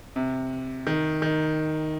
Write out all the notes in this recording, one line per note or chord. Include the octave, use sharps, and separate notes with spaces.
C3
D#3
D#3